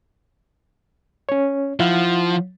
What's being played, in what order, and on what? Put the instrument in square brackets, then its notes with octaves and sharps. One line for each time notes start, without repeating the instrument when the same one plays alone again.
[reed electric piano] C#4 C#5
[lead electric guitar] F3 [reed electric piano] E4 F5 F#5